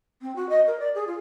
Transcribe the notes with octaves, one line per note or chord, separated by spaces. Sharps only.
C4
F#4
D#5
A#4
D5
G#4
F4